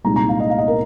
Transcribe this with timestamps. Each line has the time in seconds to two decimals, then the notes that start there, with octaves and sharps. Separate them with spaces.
0.04 C2 A#2 G#3 D#4 A#5
0.16 A#5
0.29 F5
0.40 D#5
0.50 F5
0.58 D#5
0.68 A#4